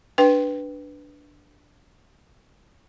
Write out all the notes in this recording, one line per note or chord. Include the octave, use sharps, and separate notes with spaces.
D4 B4 G5